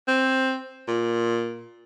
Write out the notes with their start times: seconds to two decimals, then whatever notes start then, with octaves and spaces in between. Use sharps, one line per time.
0.08 C4
0.88 A#2